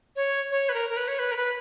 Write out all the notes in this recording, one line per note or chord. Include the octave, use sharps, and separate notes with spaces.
C#5
C#5
B4
A#4
A#4
B4
C#5
B4
A#4
B4